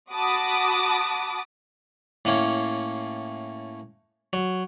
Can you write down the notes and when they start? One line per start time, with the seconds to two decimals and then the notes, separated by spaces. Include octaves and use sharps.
0.12 F#4 A5 B5 D6 D#6
2.25 A2 A#3 C#4
4.33 F#3